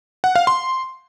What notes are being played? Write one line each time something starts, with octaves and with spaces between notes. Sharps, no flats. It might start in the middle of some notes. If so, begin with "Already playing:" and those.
F#5
F5
C6